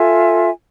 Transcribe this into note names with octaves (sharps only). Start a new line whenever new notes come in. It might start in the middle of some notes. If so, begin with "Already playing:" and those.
Already playing: F4 A4 E5 G#5